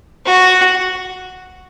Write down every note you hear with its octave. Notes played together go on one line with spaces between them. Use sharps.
F#4